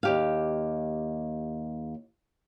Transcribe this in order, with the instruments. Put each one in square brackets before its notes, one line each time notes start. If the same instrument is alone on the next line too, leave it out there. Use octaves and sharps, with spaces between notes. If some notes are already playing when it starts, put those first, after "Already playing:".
[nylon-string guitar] D#2 G4 F5